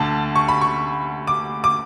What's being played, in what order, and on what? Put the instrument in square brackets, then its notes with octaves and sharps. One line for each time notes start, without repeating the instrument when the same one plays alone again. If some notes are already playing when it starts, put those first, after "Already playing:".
Already playing: [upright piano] D2 D3 A5
C#6
B5
C#6
D6
D6